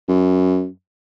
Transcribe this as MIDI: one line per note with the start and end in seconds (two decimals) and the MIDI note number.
0.09 0.68 42